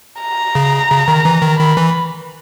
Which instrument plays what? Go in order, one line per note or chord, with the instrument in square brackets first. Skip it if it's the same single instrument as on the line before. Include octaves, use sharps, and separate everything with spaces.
[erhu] A#5
[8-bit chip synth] C#3
C#3
D#3
E3
D#3
[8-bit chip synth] D#3 [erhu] B5
[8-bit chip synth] E3